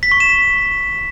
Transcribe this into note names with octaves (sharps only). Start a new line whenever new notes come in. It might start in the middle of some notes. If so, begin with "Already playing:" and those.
B6
C#6
E7